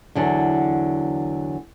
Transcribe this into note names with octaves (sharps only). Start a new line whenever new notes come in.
E2 D3 F#3